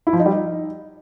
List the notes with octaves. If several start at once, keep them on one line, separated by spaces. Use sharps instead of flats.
E4
F3
D#4
G3
D#4